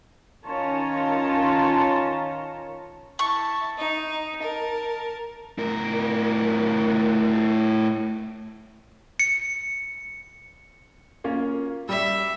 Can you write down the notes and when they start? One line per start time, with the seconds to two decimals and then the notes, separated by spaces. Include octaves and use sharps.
0.46 D#3 C#4 F4 C#5 A5 A#5
3.19 E4 A5 C#6
3.78 D#4
4.38 A#4 A5
5.58 A2 A#4
9.20 C#7
11.24 A#3 C#4 F4
11.89 G3 E5